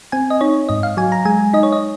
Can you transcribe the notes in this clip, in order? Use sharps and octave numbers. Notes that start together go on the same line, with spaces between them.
C4 G#5
D#5
D#4 C#5
G#2 D#5
F5
F#3 G#5
A#5
G#3 G#5
D#4 D#5
C#5
D#5